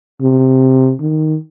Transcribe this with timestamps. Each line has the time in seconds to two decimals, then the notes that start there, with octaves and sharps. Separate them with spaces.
0.21 C3
1.01 D#3